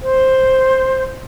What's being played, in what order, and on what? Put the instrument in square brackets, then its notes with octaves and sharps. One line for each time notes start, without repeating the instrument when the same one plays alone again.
[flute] C5